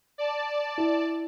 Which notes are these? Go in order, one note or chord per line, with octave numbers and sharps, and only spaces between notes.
D5 A5
E4